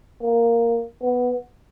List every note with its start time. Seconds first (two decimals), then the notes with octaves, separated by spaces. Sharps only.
0.22 A#3
1.03 B3